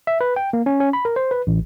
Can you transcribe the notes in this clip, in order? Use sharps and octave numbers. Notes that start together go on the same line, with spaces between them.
E5
B4
G5
A#3
C#4
C#4
B5
A#4
C5
B4
A1